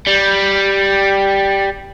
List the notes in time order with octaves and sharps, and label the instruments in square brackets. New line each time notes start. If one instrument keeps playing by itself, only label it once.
[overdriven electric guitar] G3